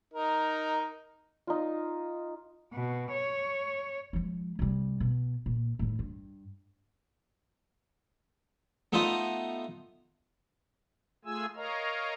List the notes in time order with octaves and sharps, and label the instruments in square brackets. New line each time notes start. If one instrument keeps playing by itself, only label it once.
[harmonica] D#4 A#4
[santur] D#4 F4
[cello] B2
C#5
[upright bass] F3 G#3
C3 G3
B2
A#2
A2 D#3
G2
[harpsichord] A3 B3 D#4 F4 C5 D#5
[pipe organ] A3 F4 G#4 G#5 E6
A#4 C#5 D#5 F5 A#5